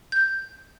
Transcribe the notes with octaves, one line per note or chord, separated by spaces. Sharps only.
G6